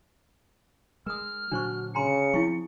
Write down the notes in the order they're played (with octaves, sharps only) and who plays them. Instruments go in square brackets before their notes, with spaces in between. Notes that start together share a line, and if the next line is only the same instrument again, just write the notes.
[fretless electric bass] G#3 [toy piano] A#4 D#6 [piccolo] F6
[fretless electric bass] A#2 D3 F#3 [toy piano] D4 C5 C#6 [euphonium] F#4
[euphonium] C#3 [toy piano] G#5 A#5 C6 [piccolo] C#7
[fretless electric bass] F3 C4 [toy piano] E4 F5 C#6